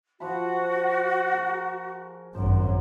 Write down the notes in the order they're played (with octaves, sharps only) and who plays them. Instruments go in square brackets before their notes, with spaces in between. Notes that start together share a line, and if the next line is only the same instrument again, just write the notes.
[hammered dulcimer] F3 F#5 B5 [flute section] F#4
[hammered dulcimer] G#4 A#4
[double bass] G#1 F#2 [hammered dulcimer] C5